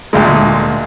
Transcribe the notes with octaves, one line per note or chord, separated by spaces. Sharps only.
D2 A#2 G#3